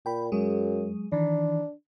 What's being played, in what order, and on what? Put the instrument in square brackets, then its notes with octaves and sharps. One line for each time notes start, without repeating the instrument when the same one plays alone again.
[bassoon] A#2 [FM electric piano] G5 B5
[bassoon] F#2 [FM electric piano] F#3 G#3 G#4
[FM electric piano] D#3 E3 [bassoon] D4